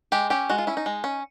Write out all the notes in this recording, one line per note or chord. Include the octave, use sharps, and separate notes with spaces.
G#3 G4
C#4 G4
G#3 F#4
F4
C#4 E4
D#4
G#3
C#4